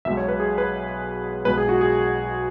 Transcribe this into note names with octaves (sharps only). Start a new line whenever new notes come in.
B1 B2 G#3 E5
C#5
B4
G#4
B4
B1 B2 G#3 B4
G#4
F#4
G#4